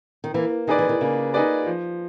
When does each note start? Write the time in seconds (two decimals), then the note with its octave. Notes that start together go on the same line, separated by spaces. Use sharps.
0.24 D#3
0.34 E3 A#3
0.67 D#3 D#4 G#4 B4 D5
0.78 E3
0.89 D#3
1.01 C#3 A#3
1.34 D#4 G#4 B4 D5
1.66 F3